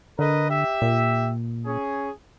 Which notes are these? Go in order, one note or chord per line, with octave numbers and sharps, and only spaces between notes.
D3 A#4 B4 D#5
G4 E5
A#2
C#4 G#4